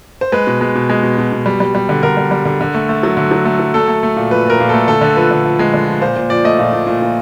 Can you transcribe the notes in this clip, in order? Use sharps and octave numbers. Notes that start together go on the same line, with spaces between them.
C5
G#3 B4
B2
G#3
B2
G#3
B2
B2
B2
G3
G3
G3
D3
D3 A#4
G3
G3
D3
D3
A3
A3
F#3
D3
F#3
A3
F#3
A3 A4
A3
A3
A#2
F3 B4
A#2 A#4
A#2
A3 A4
D3 A4
D3
F3 B4
D3
F3
G#3
D3
F3
A#2 C5
A#2
F3 D5
A3 D#5
A#2
A#2
A#2
A#2